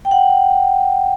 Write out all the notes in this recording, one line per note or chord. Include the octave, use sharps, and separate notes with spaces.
G5
F#5